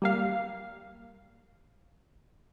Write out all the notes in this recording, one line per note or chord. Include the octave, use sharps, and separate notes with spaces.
G3 A#3 F5